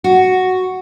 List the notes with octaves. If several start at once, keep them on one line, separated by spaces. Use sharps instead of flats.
F#4